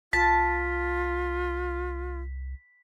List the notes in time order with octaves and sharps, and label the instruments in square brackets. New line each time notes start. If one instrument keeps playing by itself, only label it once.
[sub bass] C2 [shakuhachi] F4 [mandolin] A5 [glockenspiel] B6